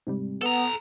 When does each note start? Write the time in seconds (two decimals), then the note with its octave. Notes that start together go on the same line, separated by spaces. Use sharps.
0.07 G#2 C3 G3
0.41 B3 A4 A#5 E6